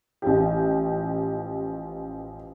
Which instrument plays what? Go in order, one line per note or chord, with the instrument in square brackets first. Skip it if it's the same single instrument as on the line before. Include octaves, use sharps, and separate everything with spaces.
[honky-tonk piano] A1 G4 [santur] F3